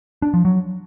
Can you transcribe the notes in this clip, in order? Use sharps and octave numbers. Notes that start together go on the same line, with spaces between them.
D4
F3
F#3